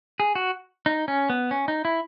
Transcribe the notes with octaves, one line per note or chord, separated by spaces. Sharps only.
G#4
F#4
D#4
C#4
B3
C#4
D#4
E4